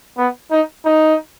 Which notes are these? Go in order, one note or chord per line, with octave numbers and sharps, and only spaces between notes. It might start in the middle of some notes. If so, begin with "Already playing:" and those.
B3
D#4
D#4